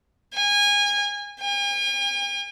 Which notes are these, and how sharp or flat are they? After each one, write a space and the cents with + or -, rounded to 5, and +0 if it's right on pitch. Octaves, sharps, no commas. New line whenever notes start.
G#5 -25
G#5 -45